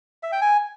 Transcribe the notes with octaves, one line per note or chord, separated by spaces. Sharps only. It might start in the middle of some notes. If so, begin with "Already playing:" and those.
E5
G5
G#5